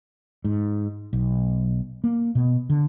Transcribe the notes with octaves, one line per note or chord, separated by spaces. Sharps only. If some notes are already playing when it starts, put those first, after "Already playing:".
G#2
B1
A#3
B2
D3